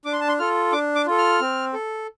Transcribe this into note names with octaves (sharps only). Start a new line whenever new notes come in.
D4 D6
C6
A5
C6
F4 A4 F6
D4 D6
D6
F4 A4
F6
C4
A4